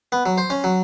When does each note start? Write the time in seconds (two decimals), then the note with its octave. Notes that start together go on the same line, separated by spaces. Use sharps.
0.12 B3
0.26 F#3
0.38 C5
0.50 C#4
0.64 F#3